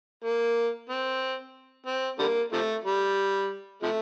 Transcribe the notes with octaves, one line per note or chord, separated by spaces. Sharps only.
A#3
C4
C4
D3 G3 A#3
C3 F3 A3
G3
C3 F3 A3